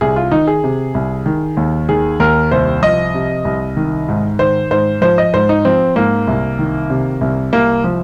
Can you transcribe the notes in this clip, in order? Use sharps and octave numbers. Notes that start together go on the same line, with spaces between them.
C2 G#4
F4
D#3 D#4
G#4
C3
C2
D#3
D#2
D#3 G#4
D#2 A#4
C2 C5
F3 D#5
C3
C2
D#3
G#2
D#3 C5
G#2 C5
F3 C5
D#5
G#2 C5
D#4
F3 C4
G#2 A#3
C2
D#3
C3
C2
C2 A#3
F3